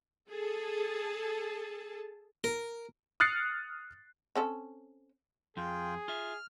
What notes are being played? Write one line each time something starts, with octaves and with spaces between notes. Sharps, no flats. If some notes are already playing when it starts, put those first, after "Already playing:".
G#4 A4 A5
A#4
D#6 F6 F#6 A6 C7 C#7
C4 C#4 A4
F2 F4 G#4 G5
F4 E5 F6